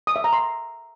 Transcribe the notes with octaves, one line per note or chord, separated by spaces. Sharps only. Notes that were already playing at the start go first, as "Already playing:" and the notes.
D#6
E5
A#5
C6